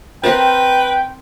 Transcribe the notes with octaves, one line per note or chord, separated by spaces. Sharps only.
C4 A#4 B4 G5 A5